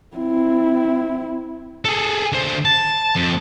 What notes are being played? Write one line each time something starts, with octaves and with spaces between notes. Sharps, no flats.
C4 E4
G#4 A4
D3 C5
A5
F2